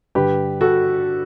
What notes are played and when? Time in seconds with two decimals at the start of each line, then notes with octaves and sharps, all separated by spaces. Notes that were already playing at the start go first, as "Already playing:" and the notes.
0.15 G2 D3 G4 B4
0.61 F#4 A4